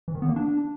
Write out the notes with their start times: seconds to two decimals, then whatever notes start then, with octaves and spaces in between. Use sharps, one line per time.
0.08 E3
0.15 D#3
0.22 B3
0.29 A#3
0.36 D4